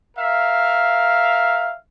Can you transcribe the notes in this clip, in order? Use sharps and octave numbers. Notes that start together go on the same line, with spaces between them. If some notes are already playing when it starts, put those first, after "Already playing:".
A#4 E5 F5